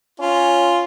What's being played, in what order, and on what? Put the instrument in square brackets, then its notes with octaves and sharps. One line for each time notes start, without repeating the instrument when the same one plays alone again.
[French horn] C#4 [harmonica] F4